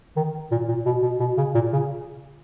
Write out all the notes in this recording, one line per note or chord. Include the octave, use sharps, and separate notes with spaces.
D#3
A#2
A#2
B2
B2
B2
C#3
A#2
C#3